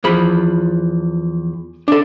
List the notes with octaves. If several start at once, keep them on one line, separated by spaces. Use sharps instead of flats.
E2 F3 B5
D4 A4